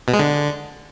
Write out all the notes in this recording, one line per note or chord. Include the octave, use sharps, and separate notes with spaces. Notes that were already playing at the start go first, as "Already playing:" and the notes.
B2
G#3
D3